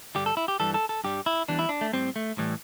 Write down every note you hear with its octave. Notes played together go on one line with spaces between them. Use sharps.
G2 D3 G3 G4
A4
E4
G4
G2 E3 G3 A4
A4
A4
G2 G3 G4
E4
E2 E3 G3 D4
E4
D4
A3
A2 G3 C4
A3
A2 E3 G3